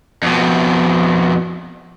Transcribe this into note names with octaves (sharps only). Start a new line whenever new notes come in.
F2 B2